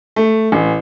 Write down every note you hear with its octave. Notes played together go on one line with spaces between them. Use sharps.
A3
A1